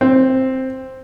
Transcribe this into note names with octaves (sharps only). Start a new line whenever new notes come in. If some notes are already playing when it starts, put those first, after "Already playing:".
C4